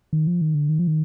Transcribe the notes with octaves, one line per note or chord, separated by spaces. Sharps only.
D#3
F3
D#3
D3
D#3
F3
D#3